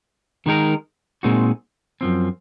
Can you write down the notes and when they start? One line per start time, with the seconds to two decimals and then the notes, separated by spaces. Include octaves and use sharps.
0.46 D#3 G#3 D#4 A#4
1.23 A#2 G#3 C4 D#4 F#4
2.01 F#2 F3 C4